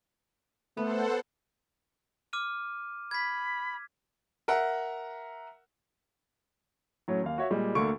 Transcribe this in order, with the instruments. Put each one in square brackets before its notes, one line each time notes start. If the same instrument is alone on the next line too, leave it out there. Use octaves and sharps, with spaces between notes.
[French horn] A3 [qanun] B3 [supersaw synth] A4 C5 F#5
[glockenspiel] D6 F6 D#7
[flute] B5 [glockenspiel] G#6 B6
[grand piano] A#4 E5 F#5
A2 F#3 C#4
D#2 F5
F#4 C#5 E5
A#2 G3 G#3
D2 D3 A#3 C#6 D7